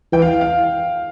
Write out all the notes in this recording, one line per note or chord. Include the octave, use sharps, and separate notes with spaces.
E3 G5
F5
F5